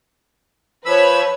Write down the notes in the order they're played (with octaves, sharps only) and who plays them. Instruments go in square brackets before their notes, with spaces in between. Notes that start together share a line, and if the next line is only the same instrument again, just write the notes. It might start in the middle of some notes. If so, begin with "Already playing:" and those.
[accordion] F3 B5 E6 [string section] B4 C#5